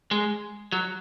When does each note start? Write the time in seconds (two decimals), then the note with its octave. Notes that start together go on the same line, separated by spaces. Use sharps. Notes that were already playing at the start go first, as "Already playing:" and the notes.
0.11 G#3
0.72 F#3